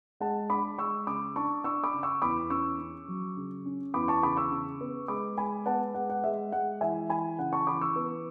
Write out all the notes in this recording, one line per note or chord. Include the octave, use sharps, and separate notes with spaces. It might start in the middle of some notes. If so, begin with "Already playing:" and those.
G#3 F#5 A5
D4 B5 D6
G#3 C#6 E6
C#3 B5 D6
D4 A5 C#6
D4 C#6 E6
B5 D6
C#3
C#6 E6
E2 B5 D6
C#4 C#6 E6
C#4
F#3
C#3
C#4
E2 B5 D6
A5 C#6
C#3 B5 D6
C#6 E6
C#3
B3
G#3 B5 D6
G#3 G#5 B5
B3 F#5 A5
G#3 F#5
F#5
G#3 E5
G#3 F#5
E3 E5 G#5
E3 G#5 B5
C#3 F#5
A5 C#6
E3 B5 D6
C#6 E6
B3